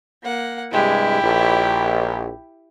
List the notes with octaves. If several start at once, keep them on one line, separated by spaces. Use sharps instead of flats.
A#3 F#5
G2 C3 G#3 E4 G4
A#1